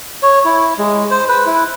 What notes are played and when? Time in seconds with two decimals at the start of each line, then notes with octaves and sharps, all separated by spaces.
0.23 C#5
0.45 E4
0.79 G#3
1.11 C5
1.29 B4
1.46 E4